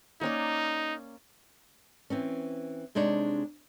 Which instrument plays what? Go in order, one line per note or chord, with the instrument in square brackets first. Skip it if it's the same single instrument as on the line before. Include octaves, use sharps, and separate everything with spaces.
[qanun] A#3 C#4 D5 [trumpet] D#4
[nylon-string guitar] E3 C4 C#4
C3 G#3 D4 D#4 C#5